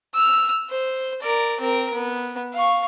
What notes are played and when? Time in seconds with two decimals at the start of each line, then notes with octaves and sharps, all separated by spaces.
0.14 E6 F6
0.69 C5
1.21 A#4 D5
1.60 C4 A#4
1.94 B3
2.53 F5 C#6